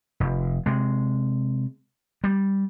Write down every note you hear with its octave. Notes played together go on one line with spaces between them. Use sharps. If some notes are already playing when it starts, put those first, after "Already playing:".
F1
C3 G#3
G3